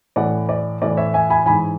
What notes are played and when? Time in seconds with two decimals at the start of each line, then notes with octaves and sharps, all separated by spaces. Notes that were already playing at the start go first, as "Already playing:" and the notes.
0.16 A2 E3 D5 F#5
0.49 D5
0.82 A2 E3 D5
0.97 C#5 E5
1.14 E5 G#5
1.30 G#5 B5
1.46 G#2 E3 G#5 B5